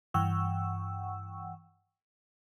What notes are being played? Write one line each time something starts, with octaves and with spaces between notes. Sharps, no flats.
G2 E3 F#5 G5 C#6 E6